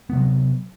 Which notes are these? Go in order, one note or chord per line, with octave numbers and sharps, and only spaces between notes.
C3 F#3 B3